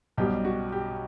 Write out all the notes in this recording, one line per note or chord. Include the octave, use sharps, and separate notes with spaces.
B1 B2 G3 G4
F#4
G4